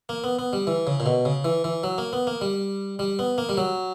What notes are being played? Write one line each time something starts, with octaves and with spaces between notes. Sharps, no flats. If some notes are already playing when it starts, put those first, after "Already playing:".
A#3
B3
B3
G3
E3
C#3
A#2
B2
C#3
E3
E3
F#3
A#3
B3
A#3
G3
G3
B3
A#3
G3
F#3